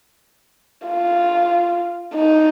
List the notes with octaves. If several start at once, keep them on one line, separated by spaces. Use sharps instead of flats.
F4
D#4